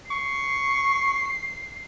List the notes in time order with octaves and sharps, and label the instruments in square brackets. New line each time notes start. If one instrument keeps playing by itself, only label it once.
[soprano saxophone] C#6 [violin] C7